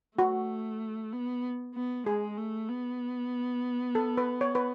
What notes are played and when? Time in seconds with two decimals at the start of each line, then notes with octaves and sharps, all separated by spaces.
0.18 A3 F#4
1.13 B3
1.75 B3
2.06 G#3 G#4
2.38 A3
2.69 B3
3.95 A4
4.17 B4
4.41 C#5
4.55 B4